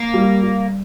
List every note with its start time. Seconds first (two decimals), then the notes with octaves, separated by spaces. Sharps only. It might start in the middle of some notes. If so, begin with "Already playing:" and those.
Already playing: A#3
0.14 G3
0.43 G3